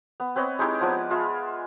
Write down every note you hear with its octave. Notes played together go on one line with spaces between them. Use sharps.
B3
C4 B4 C#5 D#5
G#3 D#4 E4 G4
F3 B3 D5 G#5
F4 G#4 E5 B5